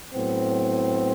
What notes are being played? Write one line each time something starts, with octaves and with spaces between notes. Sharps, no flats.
A2 F#3 B3 C4